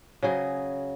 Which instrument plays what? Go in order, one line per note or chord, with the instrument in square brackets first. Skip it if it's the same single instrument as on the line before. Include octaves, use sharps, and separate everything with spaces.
[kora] C#3 F#3 G#4 D#5